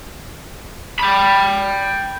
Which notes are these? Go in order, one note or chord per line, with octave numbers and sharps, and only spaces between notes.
G5 B5